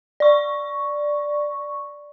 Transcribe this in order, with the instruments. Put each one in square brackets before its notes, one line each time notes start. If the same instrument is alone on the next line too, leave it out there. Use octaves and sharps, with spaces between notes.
[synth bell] D5 C#6